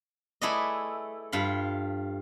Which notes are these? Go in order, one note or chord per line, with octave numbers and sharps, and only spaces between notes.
A3 E4 G#4 B4 D5 D#5
G2 F4 B5